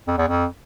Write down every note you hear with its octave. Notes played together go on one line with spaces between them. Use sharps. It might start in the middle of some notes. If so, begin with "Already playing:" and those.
F2
E2
F2